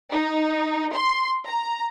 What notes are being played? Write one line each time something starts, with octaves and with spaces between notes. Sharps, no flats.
D#4
C6
A#5